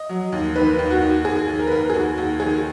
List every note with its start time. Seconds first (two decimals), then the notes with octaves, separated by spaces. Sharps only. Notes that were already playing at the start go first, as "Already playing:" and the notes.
Already playing: D#5
0.09 F#3
0.32 D#2
0.55 D#3 B4
0.79 D#2
0.90 F#4
1.02 D#2
1.24 D#2 G#4
1.48 D#2
1.59 A#4
1.67 B4
1.72 D#2 A#4
1.90 G#4
1.94 D#2 F#4
2.17 D#2 F#4
2.40 D#3 G#4